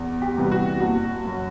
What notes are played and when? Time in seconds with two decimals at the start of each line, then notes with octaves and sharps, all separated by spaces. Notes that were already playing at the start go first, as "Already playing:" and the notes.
Already playing: E2
0.22 G4
0.37 C3 E3 G3 B3
0.51 F#4
0.80 F#1 F#4
1.25 F#2 F#3